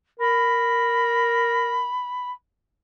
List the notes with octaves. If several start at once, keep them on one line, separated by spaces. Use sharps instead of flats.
A#4 B5